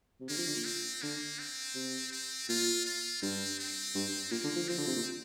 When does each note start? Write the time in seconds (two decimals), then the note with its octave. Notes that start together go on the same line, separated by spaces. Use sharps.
0.21 C3
0.29 D3 A#3
0.37 F3
0.47 D3
0.56 A#2
0.65 C4
1.02 D3 A#3
1.39 C4
1.75 C3
2.12 C4
2.49 A#2 F4
2.85 F4
3.22 G2 C4
3.59 C4
3.95 G2
4.31 A#2 A#3
4.44 D3
4.56 F3
4.68 F3 C4
4.78 D3
4.87 C3
4.96 A#2